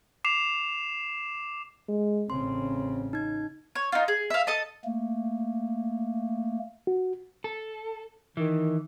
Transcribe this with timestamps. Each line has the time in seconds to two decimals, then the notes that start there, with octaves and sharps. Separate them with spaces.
0.24 D6 C7 E7 F7
1.89 G#3
2.30 A1 C#3 C4 C6
3.13 D#4 G#6
3.75 C#5
3.92 D#4 F4
4.08 G#4
4.30 E5 F5
4.47 A4 D#5 A5
4.85 A3 A#3
6.87 F#4
7.44 A4
8.37 D#3 E3